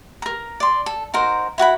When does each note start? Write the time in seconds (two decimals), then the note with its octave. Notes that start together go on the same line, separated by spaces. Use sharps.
0.22 A#4 A#5
0.60 D5 C6
0.86 A4
1.14 D#4 F#4 A#4 C5
1.58 E4 F#4 F#5 B5